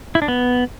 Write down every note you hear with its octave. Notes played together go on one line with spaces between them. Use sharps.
E4
D4
B3